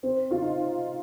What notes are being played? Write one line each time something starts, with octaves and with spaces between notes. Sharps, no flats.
C4
F4
D#4